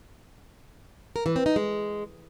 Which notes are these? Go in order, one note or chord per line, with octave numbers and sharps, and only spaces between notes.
A#4
E3
C4
D#4
G#3